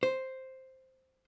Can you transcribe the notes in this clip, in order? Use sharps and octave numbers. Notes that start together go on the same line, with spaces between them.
C5